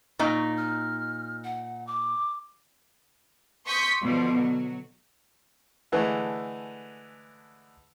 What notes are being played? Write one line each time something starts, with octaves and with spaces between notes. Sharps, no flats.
A#2 D#4 C#6
F6
F#5
D6
C6 C#6 D#6 G6 B6 C#7
B2 D3 F3
F#3
D3 E3 G#3 A3